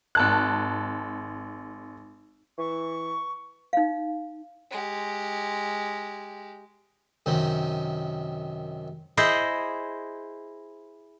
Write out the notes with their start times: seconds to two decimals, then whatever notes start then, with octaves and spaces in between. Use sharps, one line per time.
0.15 G#1 A5 F#6
2.58 E3 C#6
3.73 D#4 F5
4.71 G#3 G4
7.26 F#2 C3 D#3
9.17 E4 G#4 C5 D#5